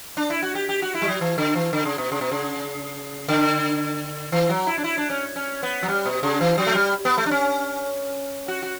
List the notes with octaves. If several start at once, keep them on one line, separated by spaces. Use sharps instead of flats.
D4
E4
F#4
G4
G4
F#4
E4
G3
F#3
E3
D3
E3
D3
C#3
B2
C#3
B2
C#3
D3
E3
F#3
E4
D4
E4
D4
C#4
C#4
B3
F#3
G3
B2
C#3
E3
F#3
A3
G3
B3
A3
D4
C#4
F#4
F#4